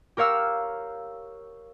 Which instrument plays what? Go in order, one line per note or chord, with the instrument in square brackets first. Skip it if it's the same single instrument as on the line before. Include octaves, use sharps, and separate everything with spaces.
[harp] G4 A#4 C#5 F5 E6